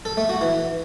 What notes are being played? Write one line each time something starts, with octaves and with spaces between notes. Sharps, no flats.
A4
A3
F#4
E3